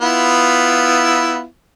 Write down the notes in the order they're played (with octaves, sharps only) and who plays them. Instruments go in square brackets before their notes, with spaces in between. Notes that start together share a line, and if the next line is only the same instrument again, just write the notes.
[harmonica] B3 E4 F4